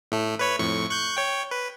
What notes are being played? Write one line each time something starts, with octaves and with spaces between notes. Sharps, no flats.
A2 A3
B4 C#5 B5
F2 A2 C#6
C#6 F#6 G6
C#5 G5
B4